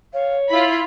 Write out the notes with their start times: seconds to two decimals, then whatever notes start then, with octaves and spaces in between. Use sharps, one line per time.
0.13 C#5 F5
0.50 E4 F4 B5